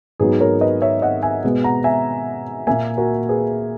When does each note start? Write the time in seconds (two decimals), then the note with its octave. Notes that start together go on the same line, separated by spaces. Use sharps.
0.20 G#2 F#3 B3 G#4 B4
0.40 A#4 C#5
0.61 B4 D#5
0.82 C#5 E5
1.02 D#5 F#5
1.23 E5 G#5
1.44 B2 G#3 B3
1.64 F#5 A#5
1.84 E5 G#5
2.67 A#2 A#3 E5 G#5
2.98 F#4 A#4
3.29 G#4 B4